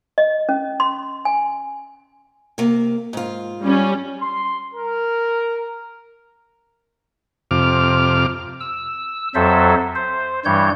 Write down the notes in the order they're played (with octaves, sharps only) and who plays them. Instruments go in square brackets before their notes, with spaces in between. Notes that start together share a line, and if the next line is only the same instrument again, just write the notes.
[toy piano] D#5
C#4
C6
G#5
[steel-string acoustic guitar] C3 A#3
G#2 F4
[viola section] G3 C#4
[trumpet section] C6
A#4
[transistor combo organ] F2 C3 D6 F6
[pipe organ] E6
F2 F#3 A4 C5 E5
C5
G2 E3 G3 C#5 G6